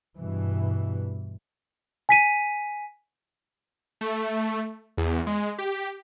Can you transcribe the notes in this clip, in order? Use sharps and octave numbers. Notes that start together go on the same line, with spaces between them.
G2 B2 E3
G#5 B6 D#7
A3
E2
G#3
G4